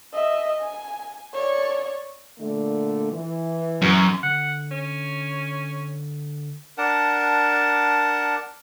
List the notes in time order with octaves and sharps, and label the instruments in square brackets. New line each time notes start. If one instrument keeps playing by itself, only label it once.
[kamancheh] D#5 E5
G#5
C#5 D5
[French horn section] A#2 D3 A3
E3
[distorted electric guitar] F#2
[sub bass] D3 [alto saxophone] F#5
[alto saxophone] C#4
[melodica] D4 A#4 F#5 A5